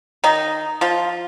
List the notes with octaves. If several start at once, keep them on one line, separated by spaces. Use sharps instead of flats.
D#3 D#4
F3 F4